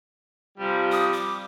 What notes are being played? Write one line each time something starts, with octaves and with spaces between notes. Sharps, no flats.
C3 F3 G3
D#6
D6